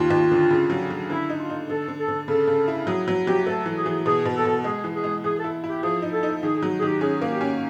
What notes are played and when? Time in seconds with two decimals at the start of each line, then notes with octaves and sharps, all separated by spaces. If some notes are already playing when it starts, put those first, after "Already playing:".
Already playing: D#2 F4
0.11 D#2
0.31 D3
0.50 C#3
0.70 F#3
0.90 F#3
1.10 D3 E4
1.30 D#4
1.39 F4
1.50 D#4
1.69 D3 A4
1.88 D3
1.98 A4
2.08 D3
2.28 C#3 A4
2.47 C#3
2.68 E4
2.87 F#3 G#4
3.08 F#3
3.27 F#3 G4
3.46 A3 A4
3.66 E3
3.76 G#4
3.86 E3
4.05 B2 G#4
4.25 B2
4.35 A4
4.45 B2
4.64 G#3 G#4
4.84 E3
4.94 G#4
5.04 G#3
5.24 E3 G#4
5.39 A4
5.44 E4
5.64 E4 G4
5.83 F3 G#4
6.02 D#4
6.12 A4
6.23 D#4
6.43 D#3 G#4
6.57 G#4
6.63 F#3
6.79 G#4
6.82 D#3 G4
7.01 C#4 G#4
7.21 A#3
7.31 G4
7.41 C#4